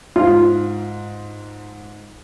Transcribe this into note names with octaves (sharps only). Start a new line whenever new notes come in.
G#2 F4